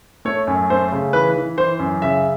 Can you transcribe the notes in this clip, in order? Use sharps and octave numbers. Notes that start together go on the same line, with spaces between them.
A3 C#5
F#2
A3 C5
C#3
E3 B4
E3
E3 C5
F#2
C#3 E5